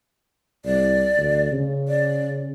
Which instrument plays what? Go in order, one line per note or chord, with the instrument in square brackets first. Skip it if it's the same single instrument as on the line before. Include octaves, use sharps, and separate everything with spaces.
[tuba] C2 [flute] D5
[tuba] D2
C#3
[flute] D5